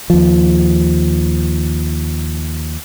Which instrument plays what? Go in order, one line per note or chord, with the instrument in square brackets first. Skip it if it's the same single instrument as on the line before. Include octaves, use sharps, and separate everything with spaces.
[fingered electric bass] D#2 F3